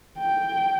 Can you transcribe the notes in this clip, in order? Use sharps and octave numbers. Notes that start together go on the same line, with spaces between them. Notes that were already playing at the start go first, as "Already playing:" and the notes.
G5